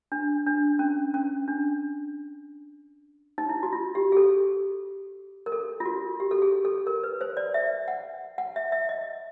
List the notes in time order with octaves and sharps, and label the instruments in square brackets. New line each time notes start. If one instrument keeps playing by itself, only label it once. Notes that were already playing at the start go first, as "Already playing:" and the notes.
[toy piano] D4
D4
C#4
C#4
D4
D#4
E4
F#4
F4
G4
G#4
A4
A#4
A4
F4
F#4
G4
A4
G#4
A4
A#4
B4
C5
D5
E5
F#5
F#5
E5
E5
D#5